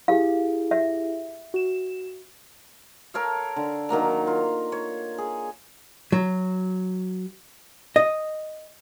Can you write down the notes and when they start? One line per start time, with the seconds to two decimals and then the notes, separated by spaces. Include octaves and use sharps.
0.08 E4 G4 G#4 F5
0.71 E5
1.54 F#4 E7
3.14 A4 A#4 C#5 F5
3.56 D3
3.89 D#3 F#3 A#3 A#5
4.27 F4
4.72 C#5
5.18 G#4
6.12 F#3
7.96 D#5